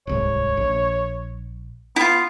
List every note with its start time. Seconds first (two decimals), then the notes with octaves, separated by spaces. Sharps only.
0.07 D1 C2 G#2 C#5
0.57 A#1
1.96 B3 E4 F4